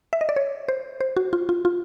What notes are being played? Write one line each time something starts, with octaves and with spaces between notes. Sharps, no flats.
E5
D#5
D5
C#5
C5
C5
F#4
F4
F4
F4